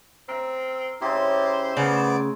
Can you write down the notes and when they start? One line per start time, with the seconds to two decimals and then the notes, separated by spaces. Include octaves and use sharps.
0.28 C4 A#4 E5
1.01 C#3 C4 D#4 E4 G4 C5
1.77 C#3 A3 B3 D5 D6